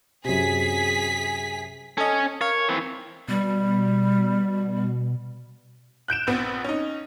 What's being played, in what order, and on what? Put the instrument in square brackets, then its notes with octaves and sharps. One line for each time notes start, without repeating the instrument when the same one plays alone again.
[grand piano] F#2 C3 [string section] G#4 B6
[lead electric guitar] C#4 [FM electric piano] A4 D#5
[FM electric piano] A#4 F5 [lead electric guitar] C#5
[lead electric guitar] E3 C4
[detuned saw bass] B2 [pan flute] G3
[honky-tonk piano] F#6 G6 D7 E7
A#1 B3 C4
C#4 D#4